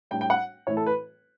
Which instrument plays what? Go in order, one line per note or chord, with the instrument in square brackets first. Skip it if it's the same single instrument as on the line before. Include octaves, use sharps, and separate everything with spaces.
[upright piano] A2 G3 D4 G5
G5
F#5
A2 E3 A3 E4 C#5
A4
B4